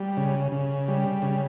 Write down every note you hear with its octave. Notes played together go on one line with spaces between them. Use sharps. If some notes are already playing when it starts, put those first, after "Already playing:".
Already playing: G3
C#3
C#3
G3
C#3